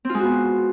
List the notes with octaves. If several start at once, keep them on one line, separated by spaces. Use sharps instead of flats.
G#3 B3 C4 F4 F#4